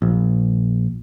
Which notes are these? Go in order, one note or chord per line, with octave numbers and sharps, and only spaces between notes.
A#1